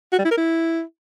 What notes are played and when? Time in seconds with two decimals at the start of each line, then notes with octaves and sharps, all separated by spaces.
0.12 F#4
0.19 G3
0.25 E4
0.31 A#4
0.38 E4